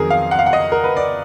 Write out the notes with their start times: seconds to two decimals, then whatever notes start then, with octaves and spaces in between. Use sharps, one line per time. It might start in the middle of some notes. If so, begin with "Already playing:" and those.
Already playing: F2 D#3 F#3 G#4 A#4
0.10 F5
0.31 F#5
0.39 F5
0.46 F#5
0.53 D#5
0.72 A#4
0.84 B4
0.97 D5